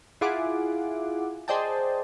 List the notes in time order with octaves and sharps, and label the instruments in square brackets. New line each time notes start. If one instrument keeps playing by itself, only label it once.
[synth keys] E4 F4 G#4 F#5 D6
G#4 C5 D5 D#5 G5 A5